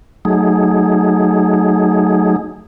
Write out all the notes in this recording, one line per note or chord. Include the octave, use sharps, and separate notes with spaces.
F#3 A3 D#4 G#4